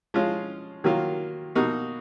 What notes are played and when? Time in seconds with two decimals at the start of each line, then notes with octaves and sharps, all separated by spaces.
0.14 F3 G#3 C#4 F4
0.84 D#3 F#3 A#3 F4
1.55 B2 A#3 D#4 F#4